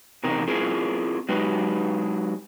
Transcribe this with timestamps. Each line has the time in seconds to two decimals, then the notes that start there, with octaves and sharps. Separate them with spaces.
0.23 E2 C3 C4 D#4 A#4
0.47 C4 E4 F4 G#4 A#4
1.29 F#3 G#3 D#4 G4 B4